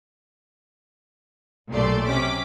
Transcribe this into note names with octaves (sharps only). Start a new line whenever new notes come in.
B1 A#2 A3 G4 D5 C6
C3 C#4 D6 B6